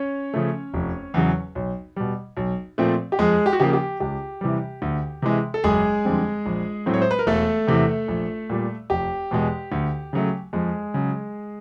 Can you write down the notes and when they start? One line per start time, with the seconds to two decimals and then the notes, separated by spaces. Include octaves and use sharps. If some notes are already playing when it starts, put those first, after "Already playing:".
Already playing: C#4 C#5
0.34 C#3 F3 A3
0.74 F1
1.14 E2 C#3 F#3
1.55 B1
1.96 B2 G3
2.37 B1
2.78 A#2 F3 A3 C4
3.12 G4
3.19 F2 G#3 G#4
3.46 G4
3.53 F#4
3.60 C#3 F3 A#3 G4
3.73 G4
4.00 C#2 G4
4.41 C3 E3 G3
4.82 D2
5.22 C3 E3 G#3
5.54 A4
5.64 F#1 G#3 G#4
6.05 F2 D3 G3 C4
6.46 A#1
6.86 A2 F#3 A3 C4
6.94 C#5
7.02 C5
7.11 B4
7.19 A#4
7.27 E1 A3 A4
7.67 E2 C3 E3
8.08 A#1
8.50 A#2 G3
8.90 F1 G4
9.31 E2 B2 G#3
9.72 D2
10.13 C#3 F#3 A3
10.53 F2 G#3 G#4
10.94 C#3 F#3